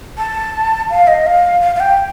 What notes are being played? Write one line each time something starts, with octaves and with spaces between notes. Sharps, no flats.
A5
F5
D#5
F5
F5
F5
G5